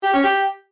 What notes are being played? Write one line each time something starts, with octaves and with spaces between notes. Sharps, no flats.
G4
C#4
G4